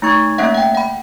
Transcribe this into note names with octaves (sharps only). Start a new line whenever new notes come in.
A3 D#4 C#6 G#6
A3 A#3 C#4 E5 F#5
F#5 G5
F#5 B5